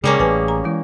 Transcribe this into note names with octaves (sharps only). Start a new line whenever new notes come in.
C#3 G3 G#3 A#3 C#4 G#4
A1 B4 G#5 A5
A#5
E3 G#3 E4